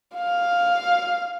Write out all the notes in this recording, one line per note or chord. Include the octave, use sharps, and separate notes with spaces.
F5